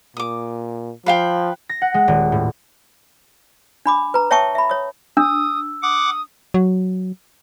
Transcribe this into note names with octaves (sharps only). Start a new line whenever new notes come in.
A#2 D6 D#6
F3 B4 F5 G5
A#6
F#5
G#3
D#1
A2
D4 B5 D6
B4 A#5
C#5 E5 G5 A5 C#6 D#6
E5 B5
C#5 D#6
D4 D#6 E6
F#5 D6 D#6
F#3